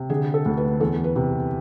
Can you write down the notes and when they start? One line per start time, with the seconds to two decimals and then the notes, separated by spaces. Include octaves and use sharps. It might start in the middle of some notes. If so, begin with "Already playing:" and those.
Already playing: C3
0.10 D3 G#4
0.34 A4
0.46 D2
0.57 B4
0.80 E2 A4
1.04 B4
1.16 C3